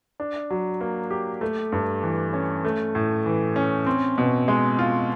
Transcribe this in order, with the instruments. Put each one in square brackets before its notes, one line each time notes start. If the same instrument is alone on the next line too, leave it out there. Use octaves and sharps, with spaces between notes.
[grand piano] D4
F#3
A#3
G4
A3
G2
E3
C#4
A3
A2
E3
C#4
C4
B2
G#3
F4